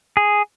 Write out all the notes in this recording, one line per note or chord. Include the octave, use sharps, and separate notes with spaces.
G#4